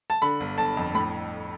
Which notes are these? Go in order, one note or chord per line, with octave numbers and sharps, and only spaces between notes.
A5
D3 B5
G1
G1 A5
F2
A2 B5